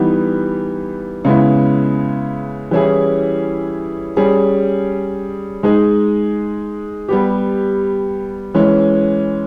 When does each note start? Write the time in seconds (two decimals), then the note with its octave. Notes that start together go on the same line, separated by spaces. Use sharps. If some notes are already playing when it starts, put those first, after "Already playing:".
Already playing: E3 G3 B3 D#4
1.25 C#3 G#3 B3 E4
2.71 E3 G3 C#4 E4 G#4
4.17 G3 C#4 G#4
5.63 G#3 D#4 G#4
7.08 G3 B3 G4
8.54 E3 G#3 C#4